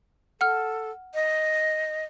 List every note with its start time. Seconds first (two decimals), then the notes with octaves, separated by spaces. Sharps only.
0.41 A4 F#5 F6
1.14 D#5